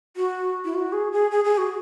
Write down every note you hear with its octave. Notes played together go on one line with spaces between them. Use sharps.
F#4
E4
F#4
G#4
G#4
G#4
G#4
F#4